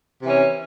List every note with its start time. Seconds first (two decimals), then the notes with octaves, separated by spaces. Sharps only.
0.20 C3
0.25 E3
0.29 C#4